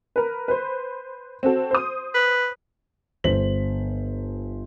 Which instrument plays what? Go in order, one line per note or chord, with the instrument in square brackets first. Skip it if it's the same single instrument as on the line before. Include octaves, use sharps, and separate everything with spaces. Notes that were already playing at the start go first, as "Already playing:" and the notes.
[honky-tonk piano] A#4 B4
B4 C5
C4 F#4 A4
C5 D#6
[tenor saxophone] B4
[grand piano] G1 C5 B6 F#7